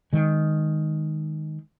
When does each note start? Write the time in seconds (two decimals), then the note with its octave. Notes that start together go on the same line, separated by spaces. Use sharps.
0.13 D#3 G#3